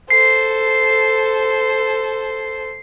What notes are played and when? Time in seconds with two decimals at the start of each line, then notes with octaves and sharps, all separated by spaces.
0.10 A4 C5 C7